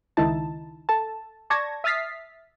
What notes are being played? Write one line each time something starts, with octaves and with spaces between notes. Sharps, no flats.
C#2 D#3 D#4 E4 A5
A4 A5
D5 A5 C#6 G#6 A#6
E5 D#6 F6 A6 B6 C7